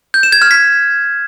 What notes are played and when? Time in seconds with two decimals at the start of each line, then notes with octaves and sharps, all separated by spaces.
0.14 G6
0.23 E7
0.32 G#6
0.42 F6
0.51 B6